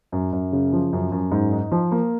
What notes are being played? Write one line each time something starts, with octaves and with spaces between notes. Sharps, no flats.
F#2
F#2
C#3
F3
F#2
F#2
G#2
D#4
F3
A#3